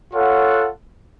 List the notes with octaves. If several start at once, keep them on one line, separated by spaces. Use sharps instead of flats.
F4 A4 C#5 F#5